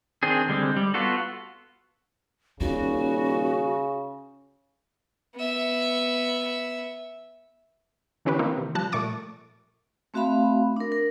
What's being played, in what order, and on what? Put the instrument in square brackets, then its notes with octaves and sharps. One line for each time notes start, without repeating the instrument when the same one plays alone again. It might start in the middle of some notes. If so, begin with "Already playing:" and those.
[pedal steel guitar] D#3 C4 D4 G#4
D3 G3 G#3 C4
G3
B3 F4 F#4 A4
[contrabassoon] D#1 [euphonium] C#3 [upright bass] D#4 [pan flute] F#4
[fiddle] B3 E5
[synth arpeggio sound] D3 E3 C#4 G4 B4
D#3 E3 A#3 C4 C#4
C3
F3 G3 A5 F#6
A#2 A3 C#6 D6 A6
[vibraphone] A3 C4 F#4 E5 F5 B5
D4 A#4
A#4